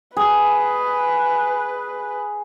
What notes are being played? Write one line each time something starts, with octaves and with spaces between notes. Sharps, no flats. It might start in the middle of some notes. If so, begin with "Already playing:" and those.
G#4 B4